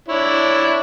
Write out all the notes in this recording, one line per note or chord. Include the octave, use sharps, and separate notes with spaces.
D4 E4 C#5